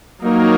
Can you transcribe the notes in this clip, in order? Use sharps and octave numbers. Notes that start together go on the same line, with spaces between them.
F#3 A#3 D#4 A#4 C#5